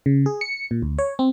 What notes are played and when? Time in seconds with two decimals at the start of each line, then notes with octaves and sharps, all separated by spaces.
0.06 C#3
0.26 G#4
0.41 C#7
0.71 A#2
0.82 D2
0.99 C#5
1.19 C4